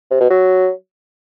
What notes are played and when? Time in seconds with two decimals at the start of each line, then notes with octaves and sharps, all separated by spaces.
0.11 C3
0.20 B2
0.30 F#3